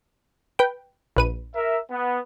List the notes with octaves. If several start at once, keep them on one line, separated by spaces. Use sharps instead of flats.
B4 G5
A#1 B4 D#7
A#4 E5
B3